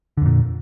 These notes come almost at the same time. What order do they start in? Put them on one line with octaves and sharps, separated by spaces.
D3 F2 A#2